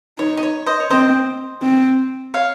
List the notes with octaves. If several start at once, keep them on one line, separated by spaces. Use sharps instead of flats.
D#4 C#5
D#5
C#5
C5 D#5
C#5
C4 C5 D#5
C4
C#5 F5